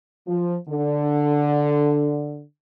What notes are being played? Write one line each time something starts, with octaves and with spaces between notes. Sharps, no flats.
F3
D3